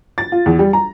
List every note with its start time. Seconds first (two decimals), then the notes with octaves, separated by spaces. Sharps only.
0.18 A6
0.32 F4
0.46 E2
0.59 G3
0.73 A#5